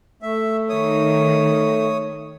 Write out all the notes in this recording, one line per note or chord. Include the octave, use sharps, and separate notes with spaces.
A3 E5
D#3 C#5 D#6